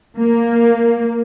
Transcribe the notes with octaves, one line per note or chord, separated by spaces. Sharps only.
A#3